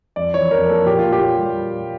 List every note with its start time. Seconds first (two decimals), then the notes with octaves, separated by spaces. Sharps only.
0.16 F2 D5
0.34 E3 C#5
0.51 F2 A#4
0.69 A#3 A4
0.86 A#2 G4
0.99 F4
1.04 A#2
1.12 G4
1.21 A#2
1.39 G3